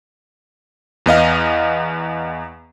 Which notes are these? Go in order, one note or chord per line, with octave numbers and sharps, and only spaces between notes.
E2 B3 D#5 F5